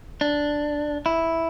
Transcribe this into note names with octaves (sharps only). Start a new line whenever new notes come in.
D4
E4